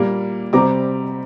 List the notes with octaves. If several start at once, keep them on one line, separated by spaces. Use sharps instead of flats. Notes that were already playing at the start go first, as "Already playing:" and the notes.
Already playing: A#2 G3 A#3
C3 G3 C4 A#5 D6